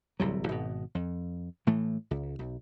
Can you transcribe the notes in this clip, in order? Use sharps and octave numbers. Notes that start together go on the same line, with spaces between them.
D1 C2 C3 F#3
G#1 B2
F2
A2 E3 A3
C#2
B1